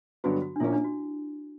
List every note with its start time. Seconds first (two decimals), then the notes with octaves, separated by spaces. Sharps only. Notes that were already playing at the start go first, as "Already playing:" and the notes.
0.24 G2 D3 F#3 B3 D4 F#4
0.42 F#4
0.56 D4
0.60 A#1 A#2 A#3 C#4 E4
0.72 D4
0.84 F#4